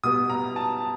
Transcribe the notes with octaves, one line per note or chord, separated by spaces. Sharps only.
B2 G3 B3 D#6
A#5
A5